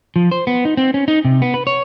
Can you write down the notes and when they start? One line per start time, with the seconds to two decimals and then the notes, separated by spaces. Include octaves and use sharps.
0.16 F3
0.31 C5
0.47 B3
0.65 D#4
0.77 C4
0.94 C#4
1.08 D#4
1.25 C3
1.42 B3
1.54 B4
1.67 C#5